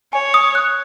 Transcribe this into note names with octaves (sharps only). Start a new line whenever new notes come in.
C#5 G#5
D#6
F#6